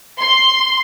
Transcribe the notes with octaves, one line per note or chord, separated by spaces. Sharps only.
C6